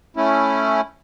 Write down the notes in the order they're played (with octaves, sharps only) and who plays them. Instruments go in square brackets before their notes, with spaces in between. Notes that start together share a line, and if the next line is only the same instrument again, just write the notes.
[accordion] A3 C#4 E4